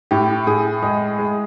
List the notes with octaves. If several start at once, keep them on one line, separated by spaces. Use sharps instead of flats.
A2 G4
A2 G#4
G#3 G#4
G#3